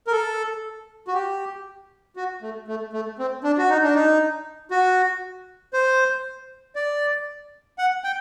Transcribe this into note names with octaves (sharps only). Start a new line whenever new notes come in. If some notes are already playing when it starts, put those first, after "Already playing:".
A#4
A4
F#4
G4
F#4
A3
A3
A3
C4
D4
F#4
D#4
D4
D#4
F#4
C5
D5
F#5
G5